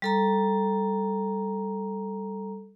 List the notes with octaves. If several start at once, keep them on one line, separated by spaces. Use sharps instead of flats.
G3 A4 A#5